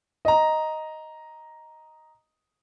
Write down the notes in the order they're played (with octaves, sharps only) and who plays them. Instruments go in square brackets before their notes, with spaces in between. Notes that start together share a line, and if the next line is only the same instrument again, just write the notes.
[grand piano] D#5 A#5